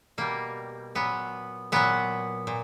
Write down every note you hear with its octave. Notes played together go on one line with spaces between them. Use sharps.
B2 G3 A#3
A#2 F#3 B3
A#2 F#3 B3
A#2